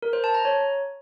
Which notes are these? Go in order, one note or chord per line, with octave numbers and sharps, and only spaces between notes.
A#4
C5
A5
A#5
C#5